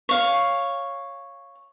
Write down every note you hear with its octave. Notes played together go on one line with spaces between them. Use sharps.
C#5 F5